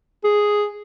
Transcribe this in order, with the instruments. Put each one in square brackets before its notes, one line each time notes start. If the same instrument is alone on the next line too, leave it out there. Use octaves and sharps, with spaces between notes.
[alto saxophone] G#4